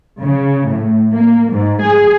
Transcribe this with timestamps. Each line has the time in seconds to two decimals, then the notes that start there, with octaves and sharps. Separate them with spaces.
0.21 C#3
0.67 A2
1.13 A#3
1.51 G#2
1.82 G#4